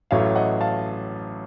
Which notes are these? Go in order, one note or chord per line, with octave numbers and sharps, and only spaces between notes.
A1 A2 F#3 A3 C#5 F5
D#5 F#5
F5 A5